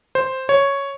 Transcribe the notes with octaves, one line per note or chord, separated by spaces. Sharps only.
C5
C#5